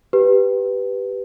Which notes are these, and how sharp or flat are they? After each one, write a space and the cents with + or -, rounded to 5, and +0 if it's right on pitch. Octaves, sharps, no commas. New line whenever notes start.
G4 +0 B4 +0